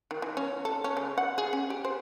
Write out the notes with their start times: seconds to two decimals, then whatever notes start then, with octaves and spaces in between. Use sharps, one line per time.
0.11 D#3
0.22 E3
0.37 C#4
0.65 A4
0.84 C#4
0.97 C#3
1.18 F#5
1.38 G#4
1.53 C#4
1.70 G4
1.85 C5